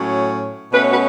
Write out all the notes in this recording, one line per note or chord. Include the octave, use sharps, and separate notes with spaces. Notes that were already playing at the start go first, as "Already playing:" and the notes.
Already playing: A2 F#3 C#4
B2 A3 C#4 B4
C#5
F#4 B4